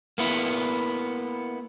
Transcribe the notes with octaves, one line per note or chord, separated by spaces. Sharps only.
A#3 B3 E4